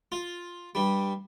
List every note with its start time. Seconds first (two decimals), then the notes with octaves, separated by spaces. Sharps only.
0.12 F4
0.75 G2 G3